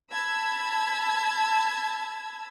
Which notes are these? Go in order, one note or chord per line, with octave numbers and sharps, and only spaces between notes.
A5 B5 E6 G#6